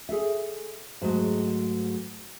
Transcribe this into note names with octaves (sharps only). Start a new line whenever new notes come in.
G#4 A4 E5
G#2 F#3 G#3 A3